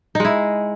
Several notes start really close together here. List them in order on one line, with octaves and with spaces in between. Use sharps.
D#4 G#3 E4